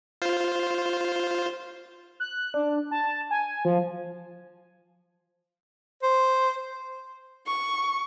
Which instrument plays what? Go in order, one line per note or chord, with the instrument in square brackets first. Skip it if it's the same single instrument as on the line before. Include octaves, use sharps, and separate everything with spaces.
[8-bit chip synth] F4 C5
[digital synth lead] F#6
D4
A5
G#5
F3
[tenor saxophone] C5
[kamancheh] C#6